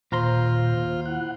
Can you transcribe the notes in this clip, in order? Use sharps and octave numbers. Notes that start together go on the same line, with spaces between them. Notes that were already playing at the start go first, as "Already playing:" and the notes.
D#2 A#2 F4 C5 A#5 C6
E4 F#5